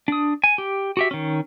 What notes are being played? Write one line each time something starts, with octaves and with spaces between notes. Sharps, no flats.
D4 D#6
G#5
G4
F#4 G4 E5
D#3 C#4